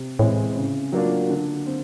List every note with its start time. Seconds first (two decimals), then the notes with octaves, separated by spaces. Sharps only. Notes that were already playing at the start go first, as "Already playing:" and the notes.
Already playing: C3
0.19 A2 E3 G#3 C4 E4
0.56 C#3
0.92 F#3 A#3 D4 F4
1.29 D3
1.67 C4